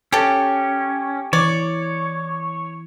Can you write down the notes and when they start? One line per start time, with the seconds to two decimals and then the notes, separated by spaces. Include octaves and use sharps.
0.12 C#4 G4 A4
1.33 E3 C#5 D5